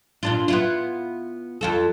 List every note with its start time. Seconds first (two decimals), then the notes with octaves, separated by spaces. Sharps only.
0.23 A#2 D4 F4
0.48 B3 E4 F4
1.61 F2 F4 A4